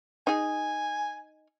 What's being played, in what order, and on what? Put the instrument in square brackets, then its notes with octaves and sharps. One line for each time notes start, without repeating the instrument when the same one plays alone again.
[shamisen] D#4 G#4 [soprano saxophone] G#5